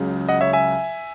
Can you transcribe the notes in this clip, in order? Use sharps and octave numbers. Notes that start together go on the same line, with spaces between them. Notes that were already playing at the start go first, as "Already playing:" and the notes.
Already playing: C#2 C#3 F#3
D#5 F#5
C#5 E5
E5 G#5